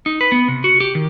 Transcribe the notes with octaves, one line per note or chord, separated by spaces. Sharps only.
D#4
B4
B3
C3
F#4
G4
D#3